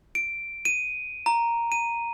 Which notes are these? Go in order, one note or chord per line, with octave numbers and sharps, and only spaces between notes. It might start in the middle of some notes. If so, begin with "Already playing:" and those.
D7
D#7
A#5
D#7